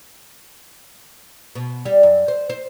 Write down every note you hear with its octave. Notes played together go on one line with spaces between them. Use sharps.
B2
G3
F#2
C5
C5